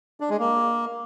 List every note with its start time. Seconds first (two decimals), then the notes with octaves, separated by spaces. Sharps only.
0.20 D4
0.30 G#3
0.39 A#3